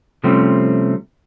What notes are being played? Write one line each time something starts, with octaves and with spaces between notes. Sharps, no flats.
C3 F3 G3 A3 C4 C#4